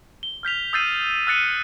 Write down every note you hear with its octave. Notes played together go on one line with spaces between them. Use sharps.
G7
F6 G6 B6 F7
D#6 E6 G6 A6 C7 D#7
E6 F#6 A6 C#7 D#7 F7